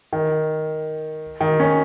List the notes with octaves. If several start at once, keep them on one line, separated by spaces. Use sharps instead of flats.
D#3
D#3
C#4